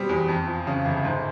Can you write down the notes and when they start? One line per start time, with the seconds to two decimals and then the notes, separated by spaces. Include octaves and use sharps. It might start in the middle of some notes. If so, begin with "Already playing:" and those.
Already playing: B2 G3 C4
0.09 E2
0.28 F2
0.47 F3
0.67 C#3
0.85 G1
1.05 G#2